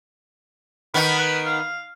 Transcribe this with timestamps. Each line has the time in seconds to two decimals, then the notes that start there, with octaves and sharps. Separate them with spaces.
0.94 D#3 B3 D#4 B5
1.18 B4
1.46 F5